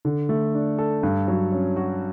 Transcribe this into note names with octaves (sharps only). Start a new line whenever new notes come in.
D3
A3
D4
A4
G2
F#3
C#4
F#4